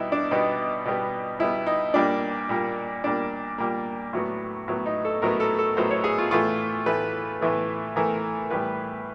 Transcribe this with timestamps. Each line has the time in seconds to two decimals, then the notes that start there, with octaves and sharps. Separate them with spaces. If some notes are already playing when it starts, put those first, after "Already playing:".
Already playing: B2 G3 B3 D#4 E4
0.12 D4
0.31 B2 G3 B3 D#4
0.85 B2 G3 B3
1.39 B2 G3 B3 E4
1.67 D#4
1.94 A#2 G3 A#3 D4
2.49 A#2 G3 A#3
3.04 A#2 G3 A#3 D4
3.58 A#2 G3 A#3
4.13 A2 F#3 B3
4.68 A2 F#3 B3
4.86 D#4
5.05 A4
5.22 A2 F#3 B3 A#4
5.40 A4
5.59 A4
5.77 A2 F#3 B3 C5
5.91 C#5
6.04 G#4
6.18 F4
6.31 A2 E3 A3 F4
6.86 A2 E3 A3 B4
7.41 A2 E3 A3
7.96 A2 E3 A3 A#4
8.50 A2 E3 G3 B3 B4